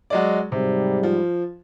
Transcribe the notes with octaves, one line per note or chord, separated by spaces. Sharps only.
F#3 G#3 D5
G#2 C3 F#3 G3
F3